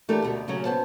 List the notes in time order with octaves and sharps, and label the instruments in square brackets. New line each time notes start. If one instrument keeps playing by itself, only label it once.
[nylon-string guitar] E3 A3 D4 G4 A#4
D2 B2
C#3 F#3 C#4
B3 C5 A5